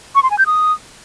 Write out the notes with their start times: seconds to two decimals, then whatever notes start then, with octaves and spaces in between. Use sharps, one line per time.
0.15 C#6
0.23 C6
0.31 G#5
0.39 G6
0.46 D#6